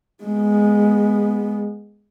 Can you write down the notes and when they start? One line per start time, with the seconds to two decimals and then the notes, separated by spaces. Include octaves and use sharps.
0.24 G#3 B3